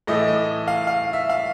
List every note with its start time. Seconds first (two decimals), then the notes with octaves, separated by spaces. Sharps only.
0.07 A2 E3 A3 D#5
0.28 D#5
0.68 F5
0.87 F5
1.13 E5
1.29 F5